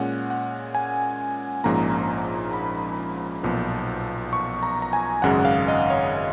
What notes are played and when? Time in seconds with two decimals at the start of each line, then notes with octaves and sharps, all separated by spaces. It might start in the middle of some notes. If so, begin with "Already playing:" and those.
Already playing: A#2 G#3 C#4 F#5
0.30 F#5
0.75 G#5
1.64 A#1 G#2 F3 A#3 C#4 A#5
2.53 B5
3.43 B1 A#2 F3 B3
4.33 C#6
4.63 A#5
4.82 A#5
4.93 G#5
5.22 G#1 F#2 C#3 G#3 F#5
5.39 F#5
5.45 F5
5.68 D#5
5.90 C#5